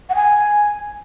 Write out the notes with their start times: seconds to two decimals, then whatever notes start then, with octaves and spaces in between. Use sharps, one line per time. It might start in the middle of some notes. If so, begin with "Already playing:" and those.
0.10 F#5
0.15 G#5